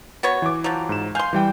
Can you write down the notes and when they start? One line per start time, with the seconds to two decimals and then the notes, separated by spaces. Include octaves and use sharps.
0.23 B3 F#4 C#5
0.42 E3 D6
0.64 F3 F#3
0.89 G#2 E7
1.15 F5 G#5 C6 G6
1.33 E3 G3 G5